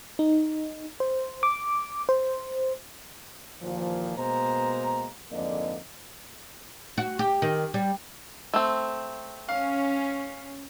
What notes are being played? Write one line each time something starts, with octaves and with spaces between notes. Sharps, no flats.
D#4
C5
D6
C5
D#2 A#2 E3 F3
B2 G#3 A#3 C5 A#5
F2 G#2 D3 A#3 D5 D#5
F#4
G4
D#3
G3
A3 C4
C#4 F5